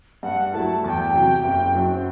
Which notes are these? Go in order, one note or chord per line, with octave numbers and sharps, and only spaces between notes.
G2 F#5
F#3 A3 E4 A5
E2 A5
G5
C3 F#3
F#1
F#2 F#3
C5